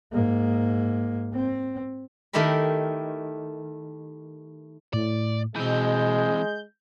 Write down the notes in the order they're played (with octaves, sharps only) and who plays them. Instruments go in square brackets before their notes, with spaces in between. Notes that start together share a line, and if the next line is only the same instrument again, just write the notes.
[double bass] G#2 A#3
C4
[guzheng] D#3 A3 E4 G4 A#4 B5
[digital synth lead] A2 [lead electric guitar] D5
[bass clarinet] B2 [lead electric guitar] E3 C4 [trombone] G#3 [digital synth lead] G6